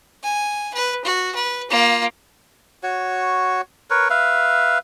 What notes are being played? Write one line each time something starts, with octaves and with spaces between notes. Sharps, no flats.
G#5
B4
F#4
B4
A#3 F4
F#4 C#5
A#4 B4 C#5
B4 E5 F5